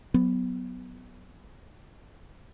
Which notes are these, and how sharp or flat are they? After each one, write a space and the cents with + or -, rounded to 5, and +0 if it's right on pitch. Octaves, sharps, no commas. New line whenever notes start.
F#3 +0 B3 +10